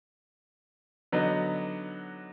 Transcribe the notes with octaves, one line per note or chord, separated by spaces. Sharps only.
D3 F#3 B3 D#4